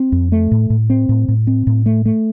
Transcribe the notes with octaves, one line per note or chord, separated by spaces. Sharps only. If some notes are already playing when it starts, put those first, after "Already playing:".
Already playing: C4
F2
A3
A2
A2
C4
A2
A2
C4
A2
A3
A3